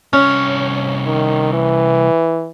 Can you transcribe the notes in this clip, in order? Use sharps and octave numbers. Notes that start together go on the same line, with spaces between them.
C2 C#4 C#5
D#3
E3